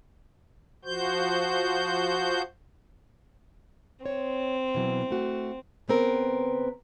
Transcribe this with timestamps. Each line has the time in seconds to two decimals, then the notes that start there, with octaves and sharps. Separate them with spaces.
0.85 F3 F#4 C5 G6
4.06 C4 C#5
4.75 B2 E3 F#3
5.10 A3 F#4
5.88 C#3 B3 C4 A#4 B4